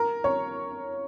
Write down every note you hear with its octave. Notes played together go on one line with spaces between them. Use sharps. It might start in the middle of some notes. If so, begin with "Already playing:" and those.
Already playing: A#4
C#5